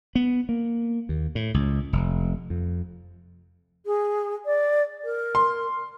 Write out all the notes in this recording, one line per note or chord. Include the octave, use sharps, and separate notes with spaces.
B3
A#3
D#2
A2
C#2
F1
F2
G#4
D5
A#4
C6